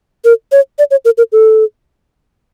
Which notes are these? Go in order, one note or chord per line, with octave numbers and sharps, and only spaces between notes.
A#4
C#5
D5
C#5
A#4
A#4
A4